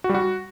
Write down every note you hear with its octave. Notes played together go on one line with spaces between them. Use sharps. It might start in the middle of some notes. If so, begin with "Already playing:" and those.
F#4
G3
F#4